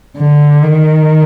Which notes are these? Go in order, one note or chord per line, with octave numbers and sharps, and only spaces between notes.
D3
D#3